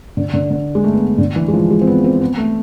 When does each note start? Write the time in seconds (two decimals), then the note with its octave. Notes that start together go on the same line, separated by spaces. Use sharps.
0.17 D3
0.34 D3
0.51 D3
0.75 G#3
0.84 A3
0.93 B3
1.18 D3
1.36 E3
1.48 G#3
1.54 F3
1.70 G#3
1.81 C4
1.87 B3
2.04 C4
2.21 B3
2.38 A3